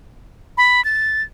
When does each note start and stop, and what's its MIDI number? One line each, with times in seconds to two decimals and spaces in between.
0.58 0.83 83
0.85 1.22 93